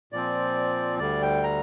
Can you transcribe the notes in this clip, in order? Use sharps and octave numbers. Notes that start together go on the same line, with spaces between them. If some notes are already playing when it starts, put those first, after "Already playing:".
A#2 F3 C4 D5
D2 D3 G3 D5
G5
A#5